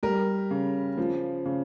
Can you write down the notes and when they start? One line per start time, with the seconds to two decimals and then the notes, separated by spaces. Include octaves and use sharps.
0.03 G3 A#4
0.51 C#3
0.98 F3
1.45 C#3